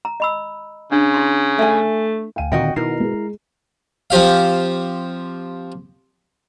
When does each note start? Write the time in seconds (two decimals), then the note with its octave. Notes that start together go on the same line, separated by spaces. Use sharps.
0.05 A#5
0.20 D#5 B5 E6
0.92 C#3 D4
1.14 E4 C6
1.59 A3 E5 G#5
2.36 D2 F5 G5 G#5 D#7
2.52 A#2 D3 D#3 C4 F#4 D#5 G5
2.76 B2 D#3 E4 A#4 C7
3.00 G#3 G#4
4.10 F3 C4 G4 F5